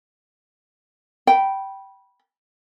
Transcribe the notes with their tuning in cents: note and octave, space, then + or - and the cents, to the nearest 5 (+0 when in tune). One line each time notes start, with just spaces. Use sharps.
G5 -15 B5 -15